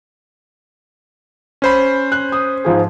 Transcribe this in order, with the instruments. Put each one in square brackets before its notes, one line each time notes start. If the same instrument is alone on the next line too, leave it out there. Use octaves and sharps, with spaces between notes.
[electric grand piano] C#4 C5 B5
[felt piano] F#6
D#6
G#2 F3 G#4